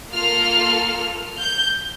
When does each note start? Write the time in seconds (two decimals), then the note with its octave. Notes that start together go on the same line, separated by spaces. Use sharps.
0.11 A#3 F4 A4 F6
1.40 G6